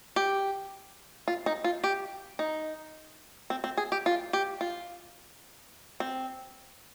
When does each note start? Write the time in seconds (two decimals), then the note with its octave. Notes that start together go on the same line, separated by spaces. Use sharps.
0.16 G4
1.28 F4
1.46 D#4
1.64 F4
1.84 G4
2.39 D#4
3.50 C4
3.64 C4
3.77 G#4
3.92 G4
4.06 F4
4.33 G4
4.61 F4
6.00 C4